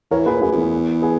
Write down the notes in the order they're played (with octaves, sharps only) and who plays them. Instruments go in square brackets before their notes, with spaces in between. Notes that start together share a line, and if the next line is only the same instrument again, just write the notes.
[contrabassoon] E3 [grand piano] A#4 C#5
[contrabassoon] A#2 [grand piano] G#4 B4
[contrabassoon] F#2 [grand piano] G#4 B4
[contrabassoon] F#2
E2
[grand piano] G#4 B4